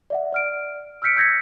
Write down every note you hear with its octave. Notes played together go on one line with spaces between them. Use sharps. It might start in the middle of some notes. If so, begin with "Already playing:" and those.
D5 E5 F#5
D5 F6 D7
E6 F6 G6 B6 C#7 D7
E6 G6 G#6 A#6 B6 C#7